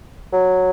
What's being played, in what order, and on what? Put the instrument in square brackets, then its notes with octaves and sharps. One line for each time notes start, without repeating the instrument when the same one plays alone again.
[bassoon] F#3